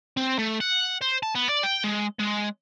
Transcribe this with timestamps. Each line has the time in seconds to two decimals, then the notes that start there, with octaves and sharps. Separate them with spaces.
0.17 C4
0.39 A3
0.60 F#5
1.01 C5
1.23 A5
1.35 B3
1.49 D5
1.63 G5
1.84 G#3
2.20 G#3